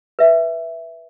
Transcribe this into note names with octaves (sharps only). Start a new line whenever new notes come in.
B4 E5